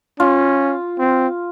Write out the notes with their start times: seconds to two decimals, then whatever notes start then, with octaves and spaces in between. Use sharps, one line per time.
0.20 C#4 F4
0.99 C4